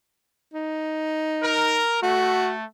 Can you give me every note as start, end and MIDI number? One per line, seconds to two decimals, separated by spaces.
0.54 1.82 63
1.43 2.00 70
2.03 2.65 57
2.03 2.52 66